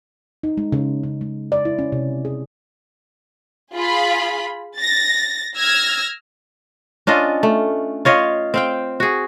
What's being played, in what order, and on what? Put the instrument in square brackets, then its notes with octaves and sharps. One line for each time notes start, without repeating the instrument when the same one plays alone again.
[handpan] D#4
G#3
C#3
C#3
G#3
D5
E4
C#4
C3
G#4
[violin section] F4 G#4 B5
A6 A#6
E6 F6 G#6 A#6
[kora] C#4 D4 F4 D#5
A3
F4 C#5 D#5 F5
C4 F5 G5
F#4 G#4